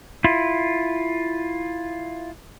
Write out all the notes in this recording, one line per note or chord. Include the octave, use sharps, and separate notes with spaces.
E4 F4